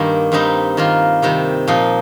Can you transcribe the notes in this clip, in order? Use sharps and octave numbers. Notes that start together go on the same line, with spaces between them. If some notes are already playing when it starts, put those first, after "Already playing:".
Already playing: G2 D#3 A#3
G2 G3 C4 D#4
D#3 A#3 F4
C3 D#3 G3
A#2 F3 D#4